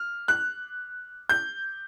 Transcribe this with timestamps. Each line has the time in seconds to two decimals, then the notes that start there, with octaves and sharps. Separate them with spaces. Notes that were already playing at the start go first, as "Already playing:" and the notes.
Already playing: F6
0.28 F#6
1.29 G6